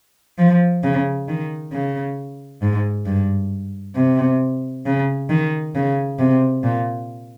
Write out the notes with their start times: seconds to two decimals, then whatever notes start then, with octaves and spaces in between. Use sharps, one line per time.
0.38 F3
0.83 C#3
1.28 D#3
1.73 C#3
2.62 G#2
3.06 G2
3.96 C3
4.86 C#3
5.30 D#3
5.75 C#3
6.19 C3
6.63 A#2